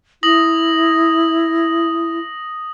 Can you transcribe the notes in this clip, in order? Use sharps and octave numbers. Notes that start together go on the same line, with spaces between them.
E4 D#6 A#6 F#7